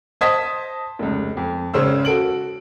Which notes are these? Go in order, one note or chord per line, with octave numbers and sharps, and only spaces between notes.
C5 D#5 A5 D#6 G#6 B6
F1 C#2
F2
G#1 C#3 C#4 G#4 C5 E6
F#4 A4 D7 F#7